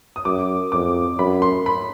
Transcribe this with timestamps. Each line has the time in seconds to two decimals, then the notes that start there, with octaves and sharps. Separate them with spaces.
0.16 D#6
0.25 F#2 D6
0.72 F2 D6
1.19 F#2 B5
1.42 C6
1.66 B5